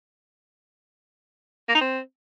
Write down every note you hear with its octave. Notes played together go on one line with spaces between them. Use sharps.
A#3
D#4
C4